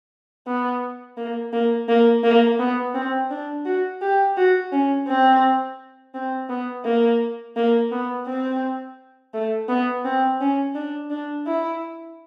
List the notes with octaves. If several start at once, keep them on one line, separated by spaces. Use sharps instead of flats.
B3
A#3
A#3
A#3
A#3
B3
C4
D4
F#4
G4
F#4
C#4
C4
C4
B3
A#3
A#3
B3
C4
A3
B3
C4
C#4
D4
D4
E4